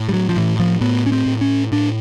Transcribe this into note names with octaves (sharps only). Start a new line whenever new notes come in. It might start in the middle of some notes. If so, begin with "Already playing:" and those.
Already playing: A2
G3
F#3
F3
A2 E3
F3
A2 B3
C#4
C4
A2
C#4
A2 D4